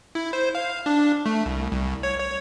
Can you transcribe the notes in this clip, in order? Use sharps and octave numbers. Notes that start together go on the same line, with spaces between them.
E4
C5
F5
D4
A3
C2
C2
C#5
C#5